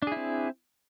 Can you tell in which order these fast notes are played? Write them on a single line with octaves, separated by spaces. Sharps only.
D4 G#4 E4 C4